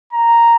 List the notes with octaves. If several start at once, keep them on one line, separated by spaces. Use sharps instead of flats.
A#5